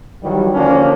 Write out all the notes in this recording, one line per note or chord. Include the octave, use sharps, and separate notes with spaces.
D#3 E3 F#3 G3
D3 F3 A#3 C#4 D4